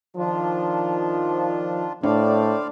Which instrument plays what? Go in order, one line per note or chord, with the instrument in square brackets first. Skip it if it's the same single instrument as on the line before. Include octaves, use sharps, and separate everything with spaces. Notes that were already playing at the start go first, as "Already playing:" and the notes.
[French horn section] D#3 F3 [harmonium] D4 F4
[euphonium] A2 [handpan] D4 [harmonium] C5 D5 F5